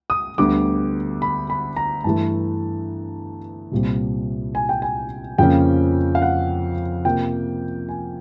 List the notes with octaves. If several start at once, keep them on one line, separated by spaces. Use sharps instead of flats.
D#6
D2 D3 G3 B3 D6
B5
B5
A#5
G2 E3 A3 A5
C2 A#2 G3 C4
G#5
G5
G#5
F2 C#3 F3 A#3 C#4 G5
F5
F#5
C3 F3 A#3 G5
G#5